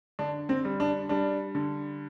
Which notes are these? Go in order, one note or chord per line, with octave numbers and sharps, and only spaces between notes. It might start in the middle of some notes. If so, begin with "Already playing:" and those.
D3 D4
C4
G3
D4
G3 D4
D3